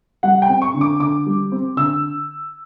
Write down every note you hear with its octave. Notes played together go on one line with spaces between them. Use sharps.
G3 F#5
G5
C4
C#6
D3
D6
D3 D6
G3
C4
D3 E6